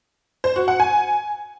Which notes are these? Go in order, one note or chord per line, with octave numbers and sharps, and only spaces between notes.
C5
F#4
F#5
G#5